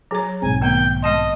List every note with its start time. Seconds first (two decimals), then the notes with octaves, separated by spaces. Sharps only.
0.11 F#3 G#4 C#5 A#5
0.42 B1 G#2 C4 G#5
0.61 D#3 A3 B3 G5
1.02 G#3 D#5 A5 C6